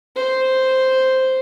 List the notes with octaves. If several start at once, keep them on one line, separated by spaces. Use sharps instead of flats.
C5